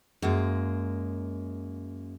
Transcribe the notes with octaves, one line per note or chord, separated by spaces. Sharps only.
F#2 G#3 A#3